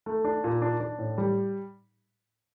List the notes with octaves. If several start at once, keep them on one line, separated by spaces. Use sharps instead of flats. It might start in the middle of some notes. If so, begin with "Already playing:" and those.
A3
D4
A#2
D4
D4
A2
G3